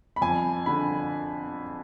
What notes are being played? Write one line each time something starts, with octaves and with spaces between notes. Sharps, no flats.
B5
F2 G#5
D3 B5